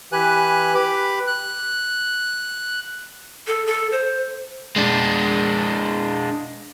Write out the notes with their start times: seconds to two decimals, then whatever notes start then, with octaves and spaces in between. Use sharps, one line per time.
0.12 E3 G4 B4 G#5 F#6
0.75 G4 B4 B5 D6
1.27 F#6
3.47 A4
3.66 A4
3.92 C5
4.76 G#3 D4